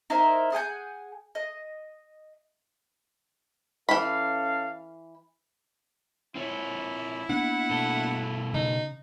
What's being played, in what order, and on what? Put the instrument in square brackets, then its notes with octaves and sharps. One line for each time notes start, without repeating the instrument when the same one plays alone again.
[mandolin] D#4 E4 A#4 C5
G#4 F#5 G#5 G6
D#5
[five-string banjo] E3 B5 [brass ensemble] C#4 A4 F5
[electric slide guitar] C4 F4 C#5 [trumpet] E4
[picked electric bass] A#3 B3 D4 [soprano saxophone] F#5
[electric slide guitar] B2 A3 A4
[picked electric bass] C#3 [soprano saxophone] D#4